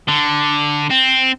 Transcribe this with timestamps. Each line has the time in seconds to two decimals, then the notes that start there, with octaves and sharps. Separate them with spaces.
0.08 D3
0.91 C4